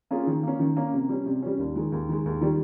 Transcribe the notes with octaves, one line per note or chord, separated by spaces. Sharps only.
A#3 C#4 F4 G#4
D#3
A#3 C#4
D#3
A#3 C#4
C3
G3 C#4
C3
G3 C#4
D#2
D#3 G#3
D#2
D#3 G#3
D#2
D#3 G3